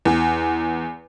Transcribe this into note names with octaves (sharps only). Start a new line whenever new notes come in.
E2